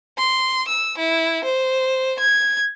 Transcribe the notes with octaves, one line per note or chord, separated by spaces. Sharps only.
C6
E6
E4
C5
G#6